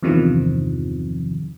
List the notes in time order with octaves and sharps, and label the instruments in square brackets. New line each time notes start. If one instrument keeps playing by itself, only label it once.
[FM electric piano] E2 G2 C3 D#3 F3